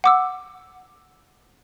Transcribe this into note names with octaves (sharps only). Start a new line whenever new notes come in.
F#5 D6 E6